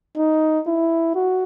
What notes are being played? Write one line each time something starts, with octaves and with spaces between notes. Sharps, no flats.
D#4
E4
F#4